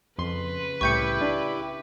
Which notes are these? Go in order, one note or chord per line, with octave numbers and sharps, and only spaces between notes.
F2 C#3 B4 C6
C2 A2 E4 G4 C#6 G6 C#7
D4